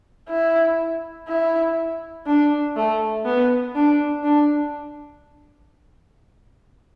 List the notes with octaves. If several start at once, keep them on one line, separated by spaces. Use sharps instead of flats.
E4
E4
D4
A3
B3
D4
D4